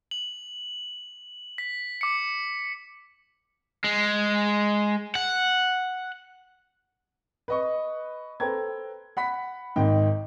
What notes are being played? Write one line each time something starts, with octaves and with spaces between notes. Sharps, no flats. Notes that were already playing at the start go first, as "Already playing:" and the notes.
F#7
B6
D6 C#7
G#3
F#5
B4 D#5 C#6
A4 B4 C5 G5 A#5 G#6
F#5 B5 B6
G#1 G#2 D#3 D#5 G5